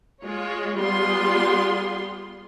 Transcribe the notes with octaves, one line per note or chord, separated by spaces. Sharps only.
G#3 F4 C#5
G3 B3 F4 G#4 C6